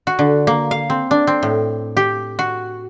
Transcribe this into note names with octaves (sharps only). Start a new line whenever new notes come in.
F#4
D3
A#3
F5
C4
D4
C4
A2
G4
F#4